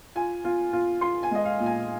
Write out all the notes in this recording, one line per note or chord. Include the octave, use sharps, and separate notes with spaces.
F4 G#5
F4
F4
F4 C6
G#5
G#3 D#5
F5
A#2
G#5